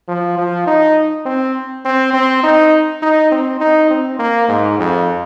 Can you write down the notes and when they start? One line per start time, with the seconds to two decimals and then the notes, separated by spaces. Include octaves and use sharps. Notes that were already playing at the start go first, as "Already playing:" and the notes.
0.08 F3
0.38 F3
0.67 D#4
1.25 C4
1.85 C4
2.14 C4
2.43 D#4
3.02 D#4
3.31 C4
3.60 D#4
3.90 C4
4.19 A#3
4.49 G#2
4.79 F2